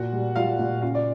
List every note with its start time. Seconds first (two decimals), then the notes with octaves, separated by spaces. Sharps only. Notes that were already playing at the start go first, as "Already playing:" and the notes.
Already playing: A#2 F#4 F#5
0.13 G3
0.36 G3 F4 F5
0.59 A#2
0.82 C#3 F4 F5
0.95 D5